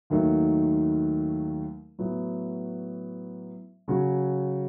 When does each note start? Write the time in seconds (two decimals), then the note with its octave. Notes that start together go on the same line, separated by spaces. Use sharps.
0.10 D#2 D#3 F#3 A3 D#4
1.99 A2 F#3 B3
3.88 C#3 F#3 C#4 F#4